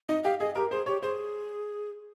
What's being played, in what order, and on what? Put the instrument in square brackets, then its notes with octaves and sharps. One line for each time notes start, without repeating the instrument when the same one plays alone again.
[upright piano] D#4 [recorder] D#5
[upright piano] G4 [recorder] F5
[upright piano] G#4 [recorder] D#5
[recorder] G4 [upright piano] A#4
[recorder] G#4 [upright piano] C5
[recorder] G4 [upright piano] C#5
[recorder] G#4 [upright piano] C5